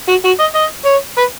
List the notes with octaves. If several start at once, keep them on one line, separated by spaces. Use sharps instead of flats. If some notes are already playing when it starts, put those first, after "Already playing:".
F#4
F#4
D#5
D#5
C#5
B4